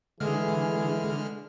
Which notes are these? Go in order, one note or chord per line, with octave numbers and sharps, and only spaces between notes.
D3 E3 G#3 G#4 F6